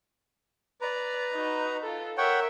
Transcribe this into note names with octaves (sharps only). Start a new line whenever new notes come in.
B4 D5 A#5
D#4 F#4
F4 A4
A#4 C#5 E5 F#5 G5